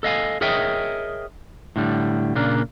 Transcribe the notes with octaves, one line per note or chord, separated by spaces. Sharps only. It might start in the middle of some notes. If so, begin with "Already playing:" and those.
A4 D#5 F5 G#5
G#4 A#4 C#5 D#5 E5 G5
A2 D3 G3
A#2 C#3 A#3 D4